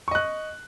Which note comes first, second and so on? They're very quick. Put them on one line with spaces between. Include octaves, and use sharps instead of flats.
C#6 D#5 F#6